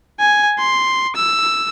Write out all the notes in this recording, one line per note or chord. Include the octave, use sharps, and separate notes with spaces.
G#5
C6
E6